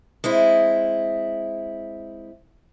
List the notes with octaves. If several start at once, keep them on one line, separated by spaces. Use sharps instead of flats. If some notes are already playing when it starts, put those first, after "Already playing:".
G#3 C4 E4